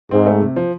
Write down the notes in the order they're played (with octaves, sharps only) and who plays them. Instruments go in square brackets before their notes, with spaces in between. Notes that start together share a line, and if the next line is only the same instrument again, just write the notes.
[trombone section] G#2 [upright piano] C4
[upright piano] A3
C3
F3